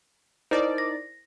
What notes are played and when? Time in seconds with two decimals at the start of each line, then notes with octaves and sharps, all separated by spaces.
0.51 D#4 E4 A#4 C5 D5
0.78 A#6